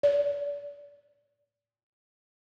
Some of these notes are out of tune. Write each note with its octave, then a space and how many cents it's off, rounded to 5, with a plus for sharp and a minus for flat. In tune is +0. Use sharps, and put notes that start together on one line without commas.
D5 -35